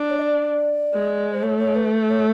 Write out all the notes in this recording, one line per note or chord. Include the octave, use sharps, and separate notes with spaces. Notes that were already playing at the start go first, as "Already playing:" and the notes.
Already playing: D4
C#5
D#5
D5
G#3
C5
A3 C#5
C#5
B4
C#5